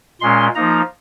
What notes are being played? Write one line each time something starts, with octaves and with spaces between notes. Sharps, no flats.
A#2 G#3 C#4 C6
F3 A#3 D#4 A#5